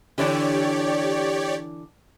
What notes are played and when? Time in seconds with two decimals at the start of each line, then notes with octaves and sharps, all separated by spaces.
0.18 D3 E3 D4 G4 C#5 D5